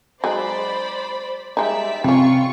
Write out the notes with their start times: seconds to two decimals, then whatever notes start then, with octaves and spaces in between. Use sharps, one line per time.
0.24 F#3 G#3 D#4 C5 D5 B5
1.57 G3 G#3 D#4 D5 E5 B6
2.04 C3 G3 C#4 F4 C#6